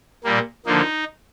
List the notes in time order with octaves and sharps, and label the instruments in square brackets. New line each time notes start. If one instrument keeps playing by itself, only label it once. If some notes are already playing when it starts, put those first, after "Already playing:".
[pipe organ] A#2 G3 A#3
D3 F3 A#3 D#4